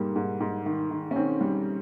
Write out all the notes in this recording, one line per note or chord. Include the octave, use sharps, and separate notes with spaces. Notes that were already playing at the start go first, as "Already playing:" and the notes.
Already playing: G#2 G3 A#3
G#2
G#2
D#3
D#3
C#4
D#3 C4
G3